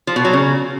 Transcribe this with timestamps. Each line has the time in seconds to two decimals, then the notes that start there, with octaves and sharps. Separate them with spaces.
0.07 F3
0.16 B2
0.25 F#3
0.33 C#3